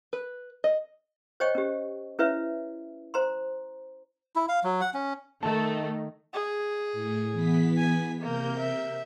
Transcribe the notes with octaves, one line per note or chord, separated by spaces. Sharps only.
B4
D#5
C5 C#5 D#5 G5 C#6
C#4 G4
C#4 E4 B4 C#5 E5
C5 A#5 C6
E4
F5
F#3
F#5
C#4
D#3 A3 A5
G#4
A2
E3 B3 B6
G#5
C3 A#3 A#4 G6
E5